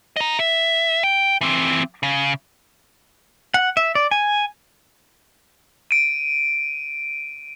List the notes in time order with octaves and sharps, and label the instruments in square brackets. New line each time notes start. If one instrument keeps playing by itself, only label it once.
[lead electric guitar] D#5 A#5
E5
G5
E3 C4
C#3
[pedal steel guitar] F#5
E5
D5
G#5
[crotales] D7 D#7